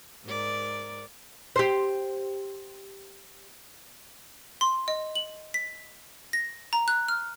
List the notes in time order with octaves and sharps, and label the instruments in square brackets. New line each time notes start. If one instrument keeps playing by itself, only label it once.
[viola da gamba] G#2 A#4 D5
[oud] G4 C5
[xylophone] C6
D#5
F#7
B6
A#6
A#5
F#6
F6